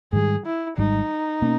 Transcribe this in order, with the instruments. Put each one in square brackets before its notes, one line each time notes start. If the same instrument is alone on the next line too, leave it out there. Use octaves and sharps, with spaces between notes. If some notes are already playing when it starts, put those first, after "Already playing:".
[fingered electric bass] G#2 D#3 G3 [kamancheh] G#4
[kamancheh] E4
[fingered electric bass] G#1 G#2 G3 [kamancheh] D#4
[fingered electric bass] B2 A#3 C#4